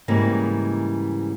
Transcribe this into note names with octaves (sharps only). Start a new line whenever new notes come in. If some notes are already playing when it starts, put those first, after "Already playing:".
G#2 C#3 E3 G3 A#3